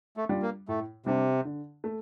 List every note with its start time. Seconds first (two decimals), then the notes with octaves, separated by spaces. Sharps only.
0.17 A3
0.29 G3 D4 F4
0.42 A#3
0.68 A2 A3
1.06 C3 G3 D4
1.45 D3
1.84 A3